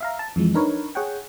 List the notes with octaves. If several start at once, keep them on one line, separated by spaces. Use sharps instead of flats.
E5 F5 A#5
A5
F2 E3 F3 G#3
D4 D#4 A#4 B4 C#5
G#4 C#5 F#5 G5